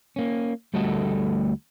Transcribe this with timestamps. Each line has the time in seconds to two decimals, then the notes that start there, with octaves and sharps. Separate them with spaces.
0.16 A#3 C#4
0.74 D2 G3 A3 F#4 A4 D#5